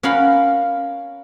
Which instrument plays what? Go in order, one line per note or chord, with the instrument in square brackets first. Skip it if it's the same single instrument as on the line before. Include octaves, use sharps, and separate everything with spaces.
[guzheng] C#4 A#4 F5 F#5 B5